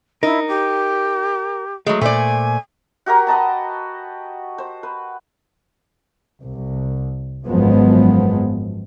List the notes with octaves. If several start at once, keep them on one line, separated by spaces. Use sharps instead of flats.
D#4 E4 A#4
G4
F#3 G#3 A3
A#2 A3 C5 D5 G#5
F#4 G4 A#4 A#5
B4 D#5 A5 A#5
C5
B4
C2
G#1 F#2 F3 G#3 B3